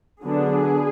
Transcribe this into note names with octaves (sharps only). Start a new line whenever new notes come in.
D3 F#3 B3 D4 G#4